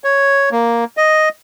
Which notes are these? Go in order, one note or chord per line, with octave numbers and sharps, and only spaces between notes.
C#5
A#3
D#5